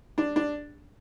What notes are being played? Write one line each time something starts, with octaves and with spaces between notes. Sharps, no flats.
D4
D4